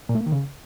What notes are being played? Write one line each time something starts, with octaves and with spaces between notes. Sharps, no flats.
A#2
A3
A#3
D#3
C#3